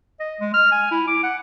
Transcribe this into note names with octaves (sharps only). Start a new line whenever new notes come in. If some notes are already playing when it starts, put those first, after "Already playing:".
D#5
G#3
F6
G#5
E4
D6
F#5